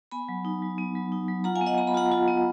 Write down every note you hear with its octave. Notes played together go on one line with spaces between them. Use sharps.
B3 G#5 B5
F#3
D#4
F#3
B3
F#3
D#4
F#3
F4 F#5 A#5
F5 G#5
B3
D#5 F#5
B3 A#5
B5
F4 F#5 A#5
F4
B3